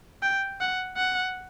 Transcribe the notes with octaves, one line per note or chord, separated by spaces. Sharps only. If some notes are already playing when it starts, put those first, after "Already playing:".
G5
F#5
F#5